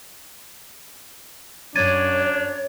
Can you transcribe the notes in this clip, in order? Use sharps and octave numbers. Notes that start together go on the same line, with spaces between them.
F#2 D4 C#5 G#6 A6 D#7